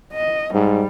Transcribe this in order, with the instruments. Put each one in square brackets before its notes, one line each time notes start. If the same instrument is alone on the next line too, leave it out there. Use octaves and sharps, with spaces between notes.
[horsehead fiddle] D#5
[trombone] G#2 [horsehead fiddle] G3